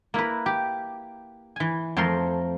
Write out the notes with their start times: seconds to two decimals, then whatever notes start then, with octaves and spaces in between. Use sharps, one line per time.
0.14 A#3 E4 A#4 B4
0.46 G4
1.56 E3 G#5
1.97 F2 F3 A3 A#4 C6